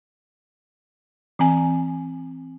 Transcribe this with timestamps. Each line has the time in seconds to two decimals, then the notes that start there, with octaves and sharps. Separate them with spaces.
1.39 E3 C4 G#5